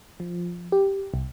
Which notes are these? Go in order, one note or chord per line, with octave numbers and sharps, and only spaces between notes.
F3
G4
C2